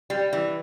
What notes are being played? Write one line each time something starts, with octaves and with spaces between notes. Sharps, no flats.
G3
E3